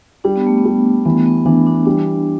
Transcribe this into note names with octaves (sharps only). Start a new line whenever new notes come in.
G3 D4
B3
A3
B3
G3
E3 B3
B3
E3 D4
D4
G3 D4